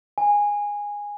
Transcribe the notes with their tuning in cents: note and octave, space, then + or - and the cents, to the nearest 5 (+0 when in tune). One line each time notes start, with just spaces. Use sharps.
G#5 -15